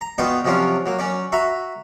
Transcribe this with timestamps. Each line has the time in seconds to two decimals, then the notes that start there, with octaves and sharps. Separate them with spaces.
0.01 A#5
0.18 B3 D#4 F4 F#4 D5 G5
0.45 C3 F3 F#3 C#4 D4 F4
0.86 F#3 A#3
0.99 F#3 C#4 D5
1.32 F#4 E5 A#5 B5